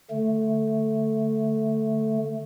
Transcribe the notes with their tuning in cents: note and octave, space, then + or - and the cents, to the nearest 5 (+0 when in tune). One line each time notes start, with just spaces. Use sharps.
D3 +0 A3 +0